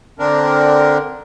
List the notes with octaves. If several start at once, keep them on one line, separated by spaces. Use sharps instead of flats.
D3 C4 D4 A#4